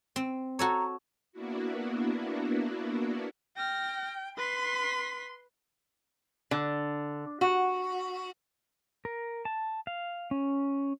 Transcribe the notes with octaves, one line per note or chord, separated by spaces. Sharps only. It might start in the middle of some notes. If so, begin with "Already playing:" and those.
C4
F#4 A4 C#5 A#5
A#3 B3 D4 E4 F#4
G5 F6 A#6
B4 C6 B6
D3
F#4
A#4
A5
F5
C#4